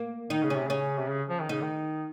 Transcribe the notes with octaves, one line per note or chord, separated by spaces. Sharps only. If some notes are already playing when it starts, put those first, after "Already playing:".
Already playing: A#3
D#3 D#4
C#3
C#4
C3
C#3 C#4
C3
C#3
F3
D#3
C#3 D#4
D#3